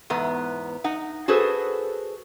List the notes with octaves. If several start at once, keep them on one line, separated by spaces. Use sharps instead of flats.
E2 G#2 B3
D#4 F#5
F#4 G#4 A4 B4 C5